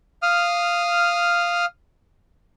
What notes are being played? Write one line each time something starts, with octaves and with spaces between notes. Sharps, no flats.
F5 D#6 F6